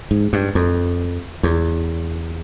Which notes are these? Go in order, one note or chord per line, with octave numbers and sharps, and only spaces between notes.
G#2
G2
F2
E2